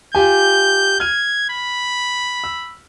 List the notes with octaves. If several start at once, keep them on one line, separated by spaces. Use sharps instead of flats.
F4 G4 G#5 G6
F6 G#6 D#7
B5
E6